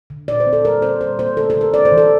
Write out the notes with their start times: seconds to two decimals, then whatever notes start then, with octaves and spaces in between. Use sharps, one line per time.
0.10 D3
0.28 A#2 D5
0.40 C5
0.47 C4
0.53 A4
0.64 G3 A#4
0.82 C4 C5
1.01 G3 C5
1.19 A#3 C5
1.37 D3 A4
1.50 A4
1.55 D3
1.61 A#4
1.73 C4 D5
1.85 C5
1.92 E3
1.98 A4